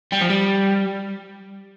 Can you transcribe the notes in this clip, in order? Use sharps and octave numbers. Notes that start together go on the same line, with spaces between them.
G3
F3
G3